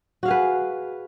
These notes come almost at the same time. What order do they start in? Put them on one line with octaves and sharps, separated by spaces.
F#4 F5 G#4 B4